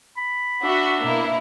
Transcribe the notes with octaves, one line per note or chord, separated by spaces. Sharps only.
B5
D4 F#4 E5 F#5
B2 A#3 E4